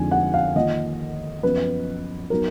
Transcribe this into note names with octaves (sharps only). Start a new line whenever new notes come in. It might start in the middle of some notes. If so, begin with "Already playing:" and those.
Already playing: F2 D3 F3 G#3 D#4 G#5
F#5
F5
D#3 A#3 F4 D#5
F#2 F3 B3 B4
F#3 B3 D#4 A#4